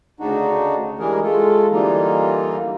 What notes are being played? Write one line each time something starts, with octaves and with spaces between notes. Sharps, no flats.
D2 C#3 D4 D#4 F#4
E3 G3 G#3 G#4 A#4
G#3 A3 F4 A4
D3 E3 G3 A#3 D#4 F4